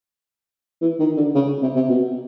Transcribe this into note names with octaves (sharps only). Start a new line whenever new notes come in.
E3
D#3
D3
C#3
C3
C3
B2